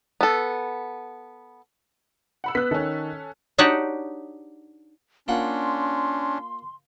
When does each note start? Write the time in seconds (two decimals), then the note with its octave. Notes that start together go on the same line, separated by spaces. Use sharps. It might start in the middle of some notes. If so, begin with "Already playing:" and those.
0.21 B3 A4
2.44 F#5 B5 E6
2.55 B3 F#6 B6
2.71 D#3 C#4 A4
3.58 D4 D#4 F#4 G4 C#5 F#5
5.28 A#3 C#4 D4 F4 F#5 C6